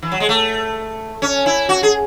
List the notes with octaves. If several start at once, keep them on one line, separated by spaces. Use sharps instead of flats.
E3
F#3
G#3
A3
C#4
E4
F#4
G#4